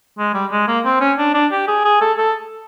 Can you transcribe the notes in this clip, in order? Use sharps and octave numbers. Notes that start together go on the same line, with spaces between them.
G#3
G3
G#3
A#3
C4
C#4
D4
D4
G4
G#4
G#4
A4
A4